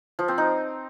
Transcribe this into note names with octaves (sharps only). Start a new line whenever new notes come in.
F3
C4
D#4